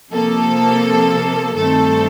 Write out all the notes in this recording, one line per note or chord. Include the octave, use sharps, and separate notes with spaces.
C3 F3 A#3 A4
G2 D#3 A3 C4 A4